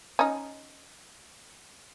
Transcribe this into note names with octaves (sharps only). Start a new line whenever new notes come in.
C#4 D#4